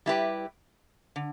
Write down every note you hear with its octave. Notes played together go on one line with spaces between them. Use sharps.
G3 E4 G4 B4
D3